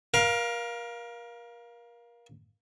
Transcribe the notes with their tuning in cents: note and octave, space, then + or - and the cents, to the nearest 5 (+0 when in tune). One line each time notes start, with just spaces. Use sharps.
A#4 +30 F5 +0